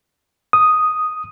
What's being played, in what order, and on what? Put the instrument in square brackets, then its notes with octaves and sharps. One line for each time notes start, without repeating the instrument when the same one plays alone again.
[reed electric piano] D#6